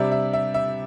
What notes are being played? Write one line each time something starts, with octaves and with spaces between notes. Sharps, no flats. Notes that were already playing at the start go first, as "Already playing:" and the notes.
Already playing: C3 G3 D4 E5
E5
E5
E5